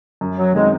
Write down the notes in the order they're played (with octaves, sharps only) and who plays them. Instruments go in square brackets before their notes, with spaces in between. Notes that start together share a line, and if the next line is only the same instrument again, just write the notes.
[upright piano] F#2
[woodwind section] F#3
[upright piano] D#3 F#3 C4 D#4 [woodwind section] G#3